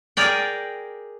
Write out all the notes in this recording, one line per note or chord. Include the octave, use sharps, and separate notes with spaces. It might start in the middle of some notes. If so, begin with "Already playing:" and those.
G#4 A#4 D5 G5